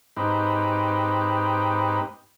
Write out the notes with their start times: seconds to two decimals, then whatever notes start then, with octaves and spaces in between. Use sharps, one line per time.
0.17 G#2 C4 D#4 G4 B4